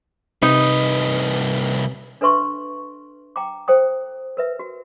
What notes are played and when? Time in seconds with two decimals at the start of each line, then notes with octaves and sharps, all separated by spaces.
0.42 C2 C3 D#4 B4
2.21 D4 A4 B4 E5 C6 C#6
3.36 G5 A#5 D6
3.68 A4 C5 G5 D#6
4.37 A#4 B4 E5
4.59 F#4